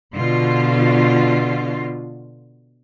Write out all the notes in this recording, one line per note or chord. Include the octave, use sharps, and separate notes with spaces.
B2 D3 F4